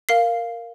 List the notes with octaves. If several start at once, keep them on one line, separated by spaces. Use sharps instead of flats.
A#4 F5 C7